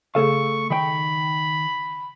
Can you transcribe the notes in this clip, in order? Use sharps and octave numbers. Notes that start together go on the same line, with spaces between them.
C#3 A3 G#4 A4 F5 C#6
D#3 G5 B5